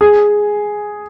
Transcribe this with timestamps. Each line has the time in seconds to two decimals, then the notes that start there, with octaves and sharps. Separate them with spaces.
0.01 G#4